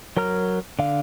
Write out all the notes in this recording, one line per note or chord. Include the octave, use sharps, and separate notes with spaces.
F#3 A#4 A#5 F6
D3 F5